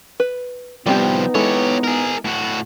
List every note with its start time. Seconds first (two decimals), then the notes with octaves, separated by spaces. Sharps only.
0.20 B4
0.86 C2 F3 G3 B3 C4 D#4 G4
1.35 G#3 E4 G4 A4 C#5
1.84 G#4 A#4
2.25 A2 F#4